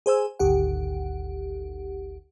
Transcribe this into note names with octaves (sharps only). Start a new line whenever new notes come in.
G#4 C5 G#5 E6
G#1 D2 G4 F#5